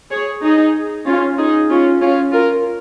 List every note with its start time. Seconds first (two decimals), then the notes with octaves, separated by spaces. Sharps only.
0.11 G#4 C#5
0.43 D#4 G#4
1.06 C#4 F4
1.38 D#4 G#4
1.69 C#4 F4
2.02 C#4 F4
2.33 F4 A#4